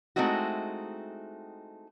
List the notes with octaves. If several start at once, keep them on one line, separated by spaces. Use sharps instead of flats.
G#3 A3 C4 D#4 E4 F#4